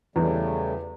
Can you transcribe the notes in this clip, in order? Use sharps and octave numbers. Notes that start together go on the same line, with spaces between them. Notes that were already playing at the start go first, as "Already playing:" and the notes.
E2 C#3 G3 A3